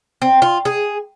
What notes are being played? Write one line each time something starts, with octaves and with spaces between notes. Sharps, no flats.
C4
F4
G#4